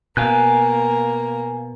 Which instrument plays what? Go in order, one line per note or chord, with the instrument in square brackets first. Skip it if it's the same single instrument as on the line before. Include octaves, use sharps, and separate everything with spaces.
[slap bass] B2 [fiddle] A#3 [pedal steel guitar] F5 G#5 F#6